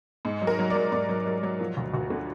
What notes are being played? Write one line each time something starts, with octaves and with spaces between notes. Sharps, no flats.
G#2
F#3
A#4
F#3
D5
F#3
G#2 D5
F#3
F#3
F#3
F3
D2
D2 F#4
D3